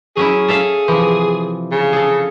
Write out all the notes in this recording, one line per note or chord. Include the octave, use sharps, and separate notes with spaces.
F#3 C#4 E4 G#4
A4 E5 F5
C3 E3 F3
C#3
G#4 A4